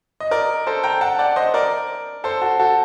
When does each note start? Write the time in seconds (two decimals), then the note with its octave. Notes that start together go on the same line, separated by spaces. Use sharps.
0.20 D#5
0.31 A#4 D5
0.67 A4 C5
0.83 G5 A#5
1.01 F#5 A5
1.19 D5 F#5
1.36 C5 D#5
1.54 A#4 D5
2.24 A4 C5
2.42 F#4 A4
2.59 F#4 A4